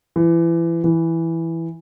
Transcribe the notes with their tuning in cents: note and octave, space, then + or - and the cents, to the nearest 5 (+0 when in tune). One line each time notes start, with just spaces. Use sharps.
E3 +25
E3 +0